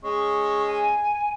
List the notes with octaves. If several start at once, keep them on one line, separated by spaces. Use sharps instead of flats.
G#3 C#4 G#4 C#6
G#5